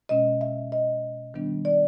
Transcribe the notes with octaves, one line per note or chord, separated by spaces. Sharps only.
B2 G#3 C#4 D#5
E5
D#5
D#3 G3 B3 D4
D5